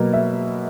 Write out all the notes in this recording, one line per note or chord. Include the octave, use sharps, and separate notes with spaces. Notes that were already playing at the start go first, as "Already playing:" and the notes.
Already playing: B2 F#3 A#3
E5